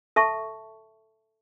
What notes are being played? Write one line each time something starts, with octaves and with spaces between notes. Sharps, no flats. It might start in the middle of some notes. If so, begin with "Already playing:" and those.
A4 E5 A5 C#6